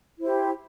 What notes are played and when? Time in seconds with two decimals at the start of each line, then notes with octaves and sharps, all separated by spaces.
0.19 E4
0.21 C5
0.24 G4